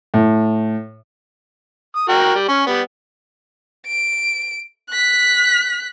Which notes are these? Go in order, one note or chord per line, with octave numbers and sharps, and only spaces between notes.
A2
D#6
F#4 A#4 G5
G3
C#4
G3 B3
D7
F#6 B6